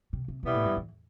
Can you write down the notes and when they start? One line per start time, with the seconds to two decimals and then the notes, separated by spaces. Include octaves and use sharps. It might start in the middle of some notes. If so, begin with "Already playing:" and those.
0.13 C3
0.28 C3
0.43 B2 E3 G3 B3 E4
0.54 A2
0.65 G2
0.77 E2